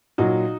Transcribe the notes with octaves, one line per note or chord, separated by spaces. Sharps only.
A#2 F#3 D#4 F#4